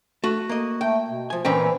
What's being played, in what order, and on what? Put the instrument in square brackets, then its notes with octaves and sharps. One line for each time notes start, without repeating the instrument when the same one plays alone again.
[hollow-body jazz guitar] A3 [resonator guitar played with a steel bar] F#4
[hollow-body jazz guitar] A#3 D#5
[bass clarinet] A3 [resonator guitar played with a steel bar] G5
[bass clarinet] B2
[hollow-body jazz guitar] F3 G#5
[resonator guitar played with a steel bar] A#2 C#4 G5 [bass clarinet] E3 [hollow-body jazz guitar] C4 A#4 A#5